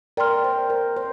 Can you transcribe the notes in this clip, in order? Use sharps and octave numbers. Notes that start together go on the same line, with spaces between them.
A#4 D5 G5 C6 F6
C5
A#4
C5